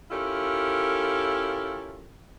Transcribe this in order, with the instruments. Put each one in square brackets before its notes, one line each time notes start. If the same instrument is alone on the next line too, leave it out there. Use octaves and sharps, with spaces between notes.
[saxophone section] C#4 E4 F4 G4 A4 A#4